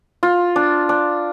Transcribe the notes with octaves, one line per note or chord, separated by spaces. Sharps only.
F4
D4
D4